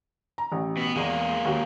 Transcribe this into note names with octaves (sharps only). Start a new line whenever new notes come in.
A#5
A1
B2 B3
E2 G#3 A#3
D#2 F#4